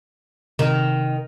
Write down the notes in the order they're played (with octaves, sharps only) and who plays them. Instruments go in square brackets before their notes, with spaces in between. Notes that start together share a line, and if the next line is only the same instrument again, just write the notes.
[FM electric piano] C3 [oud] D#3